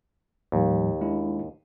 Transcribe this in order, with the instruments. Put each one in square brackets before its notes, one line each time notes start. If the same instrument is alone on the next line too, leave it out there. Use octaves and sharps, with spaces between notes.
[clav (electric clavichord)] D#2 [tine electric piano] A2 F3 G3
[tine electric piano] G#3 D4 E4